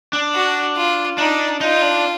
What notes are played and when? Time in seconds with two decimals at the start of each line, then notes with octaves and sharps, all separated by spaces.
0.13 D4
0.34 F#4
0.76 F4
1.18 D4 D#4
1.61 D#4 F4
1.82 D4